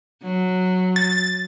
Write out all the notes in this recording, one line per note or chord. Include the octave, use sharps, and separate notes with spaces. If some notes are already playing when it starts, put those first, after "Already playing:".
F#3
A6